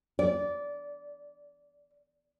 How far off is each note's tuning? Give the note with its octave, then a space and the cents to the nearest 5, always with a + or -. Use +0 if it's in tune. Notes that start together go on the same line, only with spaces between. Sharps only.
D5 -20